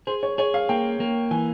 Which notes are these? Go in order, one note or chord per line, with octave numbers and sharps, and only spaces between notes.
G#4 C5
C#5
G#4 C#5
F5
A#3 G5
A#3
E3 G#5